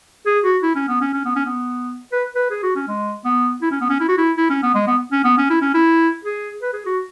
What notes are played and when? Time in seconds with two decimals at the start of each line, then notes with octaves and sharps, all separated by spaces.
0.26 G#4
0.44 F#4
0.63 E4
0.76 C#4
0.88 B3
1.01 C#4
1.14 C#4
1.25 B3
1.36 C#4
1.46 B3
2.12 B4
2.35 B4
2.50 G#4
2.63 F#4
2.75 C#4
2.88 G#3
3.25 B3
3.62 E4
3.71 C#4
3.81 B3
3.89 C#4
4.00 E4
4.09 F#4
4.18 E4
4.37 E4
4.50 C#4
4.63 B3
4.75 G#3
4.87 B3
5.12 C#4
5.24 B3
5.37 C#4
5.50 E4
5.62 C#4
5.74 E4
6.24 G#4
6.62 B4
6.73 G#4
6.86 F#4